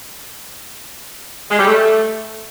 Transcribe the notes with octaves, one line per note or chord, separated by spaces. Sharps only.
G#3
G3
A3